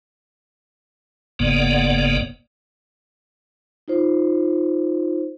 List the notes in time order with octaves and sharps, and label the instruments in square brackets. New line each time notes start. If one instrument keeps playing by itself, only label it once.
[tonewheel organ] F#1 G#2 C#3 A#3 B3 D5
[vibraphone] D#4 F4 C5